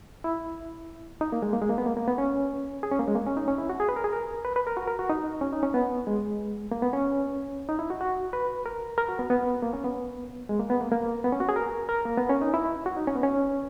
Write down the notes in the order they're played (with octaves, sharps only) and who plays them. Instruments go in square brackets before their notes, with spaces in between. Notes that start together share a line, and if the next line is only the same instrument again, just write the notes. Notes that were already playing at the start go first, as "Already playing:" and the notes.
[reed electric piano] E4
D#4
A#3
G#3
A#3
G#3
A#3
B3
A#3
A#3
B3
C#4
G#4
C#4
A#3
G#3
A#3
C#4
D#4
C#4
E4
F#4
G#4
B4
A#4
G#4
A#4
B4
B4
A#4
F#4
A#4
F#4
D#4
C#4
D#4
C#4
B3
G#3
A#3
B3
C#4
D#4
E4
F#4
F#4
B4
A#4
A#4
F#4
B3
B3
A#3
C#4
B3
G#3
A#3
B3
A#3
A#3
B3
C#4
F#4
G#4
A#4
A#4
A#3
B3
C#4
D#4
E4
F#4
D#4
C#4
B3
C#4